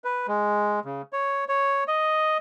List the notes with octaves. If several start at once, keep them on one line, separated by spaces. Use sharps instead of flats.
B4
G#3
C#3
C#5
C#5
D#5